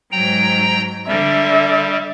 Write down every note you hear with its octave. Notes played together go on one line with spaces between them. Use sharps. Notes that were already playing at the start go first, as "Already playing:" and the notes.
G#2 F#3 G5 A#5
D3 G3 E5